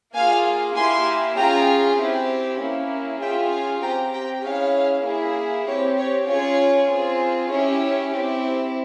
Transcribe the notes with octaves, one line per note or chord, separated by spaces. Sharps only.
A#3 F4 G#4 F5 G#5
A#3 E4 G4 G#5 C6
C#4 F4 G#4 G5 A#5
C4 E4 G4
A#3 C#4 E4
C#4 F4 G#4 E5 G5
F5 G#5
C4 G4 G5 A#5
G5 A#5
C#4 E4 G#4 C#5 F5
A#3 E4 G#4
C4 G4 C#5
C#5
C#4 F4 G#4 C#5
C4 F4 G#4
C#4 E4 G4 C#5
C4 E4 G4